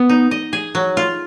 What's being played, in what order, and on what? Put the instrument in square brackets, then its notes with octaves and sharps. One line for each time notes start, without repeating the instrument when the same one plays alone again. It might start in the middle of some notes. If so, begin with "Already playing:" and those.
Already playing: [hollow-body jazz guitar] B3
[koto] D#4
D#5
G#4
F#3
F4